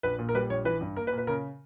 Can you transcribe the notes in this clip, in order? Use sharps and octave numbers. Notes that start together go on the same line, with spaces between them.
A#1 B4
A#2
A#4
G3 B4
A#1 C#5
E3 B4
G2
A#3 A#4
B4
A#2
B4
C#3 A#4